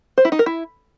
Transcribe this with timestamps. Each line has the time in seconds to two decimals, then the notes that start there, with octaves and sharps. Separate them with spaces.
0.18 C5
0.25 E4
0.32 D#4
0.39 A#4
0.46 E4